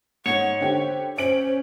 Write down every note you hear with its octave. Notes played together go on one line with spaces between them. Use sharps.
G#2 C#5 F#5
D3 G4 C5
C#4 C5 D7 F#7